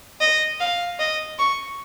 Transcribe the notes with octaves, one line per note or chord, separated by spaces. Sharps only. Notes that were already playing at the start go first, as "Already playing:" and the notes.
D#5
F5
D#5
C#6